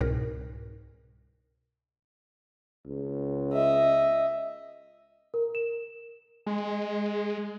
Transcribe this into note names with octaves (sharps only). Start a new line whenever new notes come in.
C2 G#2 B2 A#4
C#2
D#5 E5
A#4
E7
G#3